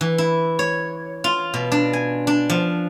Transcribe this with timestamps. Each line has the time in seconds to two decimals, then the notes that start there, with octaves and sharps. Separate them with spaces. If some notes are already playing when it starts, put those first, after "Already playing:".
0.01 E3
0.18 E4
0.59 C#5
1.24 F4
1.54 B2
1.72 D4
1.93 G#5
2.27 D4
2.50 F3